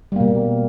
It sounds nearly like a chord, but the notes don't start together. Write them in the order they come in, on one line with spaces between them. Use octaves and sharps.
G3 A#3 B2